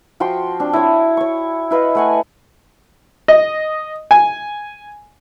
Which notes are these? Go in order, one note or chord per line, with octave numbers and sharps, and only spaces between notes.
F3 F#4 G5 C6
C4 D4
E4 C#5
C#5 C#6
E4 B4 D#5 F5
A3 F#5 G#5
D#5
G#5